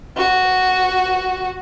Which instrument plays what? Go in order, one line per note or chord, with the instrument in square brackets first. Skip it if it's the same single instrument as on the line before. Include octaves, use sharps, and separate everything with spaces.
[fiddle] F#4